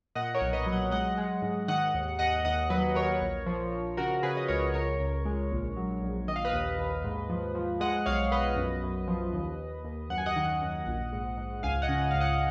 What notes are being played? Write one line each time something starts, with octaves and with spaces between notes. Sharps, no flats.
A#2 D#5 F#5
A#4 C#5
B1
B4 D#5
F#3
D#5 F#5
G#3 D#5 F#5
G#3
G#2
D#3 D#5 F#5
D#2
D#2 D#5 F#5
D#2 D#5 F#5
F#3 B4 D#5
D#2 A#4 C#5
A#1
F3
F3
C#3 F#4 A#4
C#3 G#4 B4
D#5
C#2 A#4 C#5
C#2 A#4 C#5
C#2
G#3
A#1
F#3
A#1
D#3 D#5
F5
B4 D#5
D#2
D#2
G#2
F3
F3
G#3 D#5 F#5
B1 C#5 F5
B1 B4 D#5
F#2
F#2
F3
D#2
D#2
D#2
F#2 F#5
G#5
D#5 F#5
D#3
F#2
A#1
G#2
G#2
C#2 F5 G#5
D#5 F#5
C#3
D#5
C#2 F5
D#5 F#5